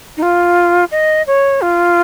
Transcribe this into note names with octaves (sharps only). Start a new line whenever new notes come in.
D#4
F4
D#5
C#5
F4